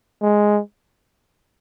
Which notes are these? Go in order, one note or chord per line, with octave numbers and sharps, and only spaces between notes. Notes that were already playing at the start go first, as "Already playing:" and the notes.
G#3